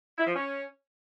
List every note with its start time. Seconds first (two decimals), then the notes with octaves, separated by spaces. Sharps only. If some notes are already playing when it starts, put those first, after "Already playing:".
0.17 E4
0.27 F3
0.36 C#4